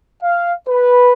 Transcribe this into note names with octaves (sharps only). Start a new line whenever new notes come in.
F5
B4